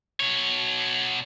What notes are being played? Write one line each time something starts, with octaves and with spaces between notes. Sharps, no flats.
B2 C#5